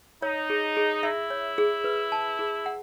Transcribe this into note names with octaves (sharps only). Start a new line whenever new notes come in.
D#4 C#5
G#4
G#4
E4 E5
C#5
G#4
B4
A5
G#4
F#5